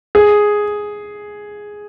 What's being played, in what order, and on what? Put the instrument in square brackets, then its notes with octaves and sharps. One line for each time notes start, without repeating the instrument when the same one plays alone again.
[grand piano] G#4